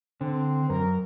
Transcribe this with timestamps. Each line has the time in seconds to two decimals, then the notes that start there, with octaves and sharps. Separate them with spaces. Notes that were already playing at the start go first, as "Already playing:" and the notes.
0.21 D3 C4
0.70 F#2 A#4